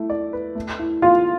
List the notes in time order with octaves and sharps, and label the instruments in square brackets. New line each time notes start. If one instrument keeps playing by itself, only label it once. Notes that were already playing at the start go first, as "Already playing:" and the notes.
Already playing: [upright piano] A3 E4
D5
B4
A3
E4
[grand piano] F4 [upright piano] F5